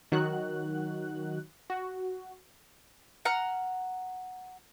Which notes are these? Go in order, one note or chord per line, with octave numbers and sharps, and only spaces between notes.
D#3 F#3 F#4 F#6
F#4
F#5 A#5 F6